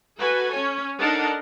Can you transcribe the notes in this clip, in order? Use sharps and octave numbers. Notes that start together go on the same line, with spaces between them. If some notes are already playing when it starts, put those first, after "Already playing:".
F#4 A4 B4 G#5
C#4 C#5
D4 D#4 A4 A#4 F#5 A5